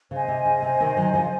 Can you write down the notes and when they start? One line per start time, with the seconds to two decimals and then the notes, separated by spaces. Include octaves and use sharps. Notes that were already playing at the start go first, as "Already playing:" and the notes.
0.10 C#3 C5 D#5 G#5
0.28 C3
0.46 C#3
0.62 C3
0.80 C3 D#3
0.97 D#3 F#3
1.14 C#3 F3